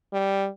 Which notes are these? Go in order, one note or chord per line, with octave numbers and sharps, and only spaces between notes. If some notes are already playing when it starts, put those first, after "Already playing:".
G3